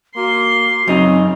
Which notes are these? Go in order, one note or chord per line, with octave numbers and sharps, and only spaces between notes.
A#3 F#4 C6
F#2 C#3 C4 D#4